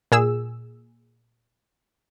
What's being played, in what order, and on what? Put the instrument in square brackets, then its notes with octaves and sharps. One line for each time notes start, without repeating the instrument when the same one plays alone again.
[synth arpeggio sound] A#2 G#4 E6